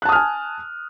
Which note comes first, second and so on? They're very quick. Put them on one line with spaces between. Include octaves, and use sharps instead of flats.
F#6 A5 D#6 F6 G#5